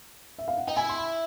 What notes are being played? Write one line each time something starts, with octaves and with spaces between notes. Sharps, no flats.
E5
F5
F#5
D#4 G5
E4 G#5
C6
B5